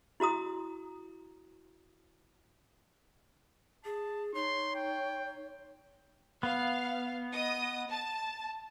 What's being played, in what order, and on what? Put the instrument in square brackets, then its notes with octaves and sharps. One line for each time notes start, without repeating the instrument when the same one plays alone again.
[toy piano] E4 F#4 A#5 D#6
[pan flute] G#4 [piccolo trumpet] A5
[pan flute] D#4 [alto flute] C#5 [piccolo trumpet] C6
[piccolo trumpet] G5
[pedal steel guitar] B3 [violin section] F5
[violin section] D#5 D#6
A5